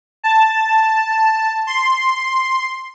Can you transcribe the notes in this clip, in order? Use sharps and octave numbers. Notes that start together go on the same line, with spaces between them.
A5
C6